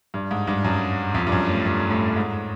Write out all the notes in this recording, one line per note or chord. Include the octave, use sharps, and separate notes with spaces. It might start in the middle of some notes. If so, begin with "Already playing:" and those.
G2
G#2
G2
F#2
F2
G2
F#2
A2
G2
A2
G#2